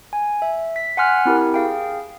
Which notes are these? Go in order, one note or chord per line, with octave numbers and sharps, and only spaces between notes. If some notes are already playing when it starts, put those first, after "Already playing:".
G#5
E5
B6
F#5 G#5 C6 F6 F#6
C4 E4 G4 A#4
G#4 F5 G5